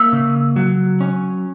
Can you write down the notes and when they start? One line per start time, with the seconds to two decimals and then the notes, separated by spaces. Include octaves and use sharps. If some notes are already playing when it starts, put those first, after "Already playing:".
Already playing: A#3 E5
0.13 C#3
0.56 F#3
1.01 C#4